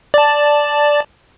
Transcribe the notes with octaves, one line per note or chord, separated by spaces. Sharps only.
D5 A5